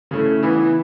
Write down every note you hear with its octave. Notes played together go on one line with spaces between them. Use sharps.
C#3 A3 E4
E3 B3 E4